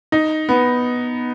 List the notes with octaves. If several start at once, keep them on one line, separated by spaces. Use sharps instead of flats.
D#4
B3